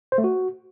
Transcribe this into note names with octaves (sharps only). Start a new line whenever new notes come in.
C5
A3
F#4